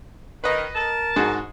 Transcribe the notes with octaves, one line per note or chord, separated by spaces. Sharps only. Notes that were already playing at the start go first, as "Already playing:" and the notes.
D#3 B4 D#5
A#4 A5
G#2 G#3 F#4